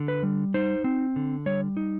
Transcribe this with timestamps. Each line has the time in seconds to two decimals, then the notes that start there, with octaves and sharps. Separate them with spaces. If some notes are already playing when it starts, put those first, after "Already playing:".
Already playing: D3
0.08 B4
0.23 G3
0.54 D#4 C5
0.84 C4
1.16 D3
1.46 G3 C#5
1.77 D#4